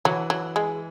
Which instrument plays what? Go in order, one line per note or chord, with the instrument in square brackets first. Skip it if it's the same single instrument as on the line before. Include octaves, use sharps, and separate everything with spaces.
[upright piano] E3 [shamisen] F#3
[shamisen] F#3
G#3